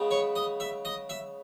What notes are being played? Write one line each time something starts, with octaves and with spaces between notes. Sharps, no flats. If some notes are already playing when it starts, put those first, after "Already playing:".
Already playing: C#3 G#3 B3
C#5
D#5
E5
D#5
E5